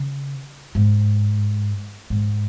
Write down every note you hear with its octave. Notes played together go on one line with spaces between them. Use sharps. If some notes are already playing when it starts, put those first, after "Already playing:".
Already playing: C#3
G#2
G#2